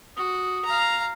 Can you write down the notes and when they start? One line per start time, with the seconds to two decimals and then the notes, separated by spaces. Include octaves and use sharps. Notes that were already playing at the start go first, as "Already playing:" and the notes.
0.17 F#4 D#6
0.65 F5 A#5